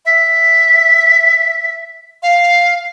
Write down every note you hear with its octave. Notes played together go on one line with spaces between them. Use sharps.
E5
F5